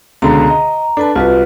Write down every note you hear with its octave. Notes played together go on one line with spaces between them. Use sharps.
C#2 B2 D3 A#5
D#5
D4 A4 B4 A5
C2 F4 F#4 B4